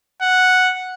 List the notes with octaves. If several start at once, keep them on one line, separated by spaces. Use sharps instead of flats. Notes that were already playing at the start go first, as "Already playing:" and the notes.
F#5